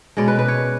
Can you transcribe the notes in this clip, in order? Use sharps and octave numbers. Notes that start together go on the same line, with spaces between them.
B2 G#3 C#4 D5
B4
B4
C#5